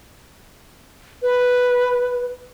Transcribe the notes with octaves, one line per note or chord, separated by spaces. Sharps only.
B4